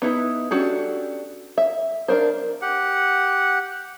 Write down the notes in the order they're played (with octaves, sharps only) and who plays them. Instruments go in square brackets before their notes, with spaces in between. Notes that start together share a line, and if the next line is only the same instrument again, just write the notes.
[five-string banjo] B3 D#4 E4 B4
C#4 D4 F#4 G4 A4
E5
D4 A#4 C5
[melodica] G4 F#5